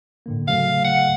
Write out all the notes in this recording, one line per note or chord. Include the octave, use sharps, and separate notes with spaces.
A2 D3 A#3
C#3 F#3 A3 F5
F#5